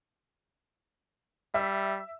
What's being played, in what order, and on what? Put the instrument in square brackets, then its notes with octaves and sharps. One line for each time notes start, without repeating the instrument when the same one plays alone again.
[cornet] G3 [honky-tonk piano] E5 E6